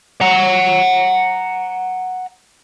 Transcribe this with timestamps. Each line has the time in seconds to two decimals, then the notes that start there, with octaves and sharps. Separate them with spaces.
0.21 F#5 A#5